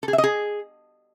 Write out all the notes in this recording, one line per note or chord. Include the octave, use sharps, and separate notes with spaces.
A4
G#4
E5
D#5
G#4